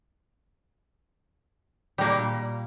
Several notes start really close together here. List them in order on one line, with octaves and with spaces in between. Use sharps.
G3 A#3 A#2